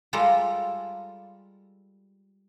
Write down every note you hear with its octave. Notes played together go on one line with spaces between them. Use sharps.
G3 G#3 F4 A4 A#4